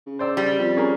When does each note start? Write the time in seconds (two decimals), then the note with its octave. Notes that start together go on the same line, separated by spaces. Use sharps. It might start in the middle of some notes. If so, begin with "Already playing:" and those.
0.06 C#3
0.19 C5 D5 E6
0.37 G3
0.59 F2
0.77 C#4 G#4 A#4